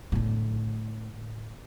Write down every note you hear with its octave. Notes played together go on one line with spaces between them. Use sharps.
A2 D3